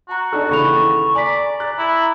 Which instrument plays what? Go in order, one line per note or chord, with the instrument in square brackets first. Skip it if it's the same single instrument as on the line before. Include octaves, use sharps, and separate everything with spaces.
[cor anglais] F#4 [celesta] A5 A#5
[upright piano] D4 D#4 A4 [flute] G#4
[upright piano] D#2 C#3 E3 [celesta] A4 B5 F7 [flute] C#6
[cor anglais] D5 [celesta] G#5 D6 B6 [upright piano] A#5
[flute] A#5 [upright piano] F#6 A6
[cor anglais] E4